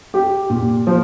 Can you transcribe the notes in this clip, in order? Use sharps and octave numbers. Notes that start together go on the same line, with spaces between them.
G4
A#2
F3